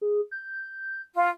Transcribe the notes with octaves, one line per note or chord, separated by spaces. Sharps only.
G#4
G6
F4